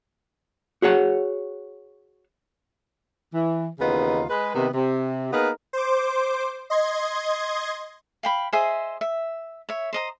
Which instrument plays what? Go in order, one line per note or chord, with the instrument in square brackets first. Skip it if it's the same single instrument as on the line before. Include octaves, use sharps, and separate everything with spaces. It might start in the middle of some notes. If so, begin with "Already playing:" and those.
[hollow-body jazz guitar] F#4 G#4 C#5 F#5
[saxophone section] E3
D#2 C#3 E3 B3 D#4 F4
G#3 B4
C3 D#3 B3
C3
A#3 B3 D#4 G#4 A#4 B4
[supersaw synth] C5 D6
D#5 C6 G#6
[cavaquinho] F5 G5 B5
G#4 C5 D#5 E5
E5
C#5 E5
C5 D#5 A#5